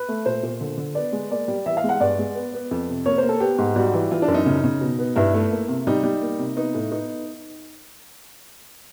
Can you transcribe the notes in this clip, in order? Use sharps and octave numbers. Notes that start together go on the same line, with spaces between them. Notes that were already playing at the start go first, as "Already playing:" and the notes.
Already playing: B4
A3
A#2 C5
A#2
D3
D3
B3 D5
G#3
A#3 D5
G3
E3 E5
F5
G#3
F#5
G2 D5
G#3
B3
B3
F2
C3
A#3 C#5
A#3 C5
A4
B3 G4
G#2
G3 F#4
E3
E3 F4
D4
F#2
D#4
C#3
C#3
B2
B3
G2 E4
A3
A#3
C3
G3 D#4
G3
A#3
C3
B3 D#4
A2
B3 D#4